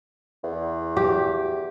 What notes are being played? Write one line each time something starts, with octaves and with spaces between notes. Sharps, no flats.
E2
G4